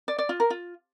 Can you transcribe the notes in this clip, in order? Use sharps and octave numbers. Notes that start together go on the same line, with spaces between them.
D5
D5
F4
A#4
F4